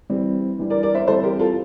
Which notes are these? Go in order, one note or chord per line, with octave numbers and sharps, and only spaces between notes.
E3 G3 C4
E3 G3 D4
A#4 D5
A#4 D5
C5 E5
E3 G3 C4 A4 C5
G4 A#4
F4 A4